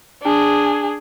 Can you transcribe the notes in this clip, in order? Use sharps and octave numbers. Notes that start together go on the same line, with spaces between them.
D4 G#4